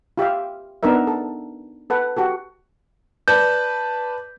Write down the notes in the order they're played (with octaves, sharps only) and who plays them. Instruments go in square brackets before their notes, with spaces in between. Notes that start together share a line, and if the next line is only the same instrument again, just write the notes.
[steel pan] F4 G4 E5 F5
B3 D4 D#4 A#4 E5
A4
A4 B4 F#5
F#4 G4 A4
[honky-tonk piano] B4 D5 A5 [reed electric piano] G6